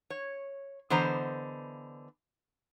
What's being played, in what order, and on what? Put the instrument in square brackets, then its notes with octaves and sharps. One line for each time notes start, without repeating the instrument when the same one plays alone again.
[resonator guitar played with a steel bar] C#5
D3 E3 B3 C5 D#5 A#5